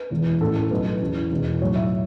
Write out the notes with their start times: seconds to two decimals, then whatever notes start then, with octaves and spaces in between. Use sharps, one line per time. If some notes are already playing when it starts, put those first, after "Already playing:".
Already playing: B4
0.10 E1 E2 E3 B3
0.41 A1 A2 E3 C#4 A4
0.56 A4
0.70 B1 B2 A3 B4
1.01 E2 E3 C#4
1.31 E1 E2 B2
1.62 B1 A2 F#3 C#5
1.76 E5